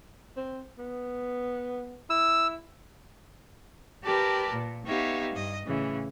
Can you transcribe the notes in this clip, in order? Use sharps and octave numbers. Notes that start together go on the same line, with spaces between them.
C4
B3
E4 E6
G4 A#4 B4 D5 G5 A5
A#2
B3 D#4 G4 C#5 E5 F5
G2 D#5
A2 C#3 E3